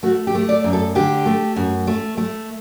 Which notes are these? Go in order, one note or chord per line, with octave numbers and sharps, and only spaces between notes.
A3 F#4
G4
A3
D5
F#2
A4
D3 G4
A3
F#2
A3
A3